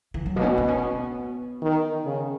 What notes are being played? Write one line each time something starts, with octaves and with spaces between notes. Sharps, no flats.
E3
F#3
B2 A#3
C#4
B3
B3
C#4
B3
D#3
C#3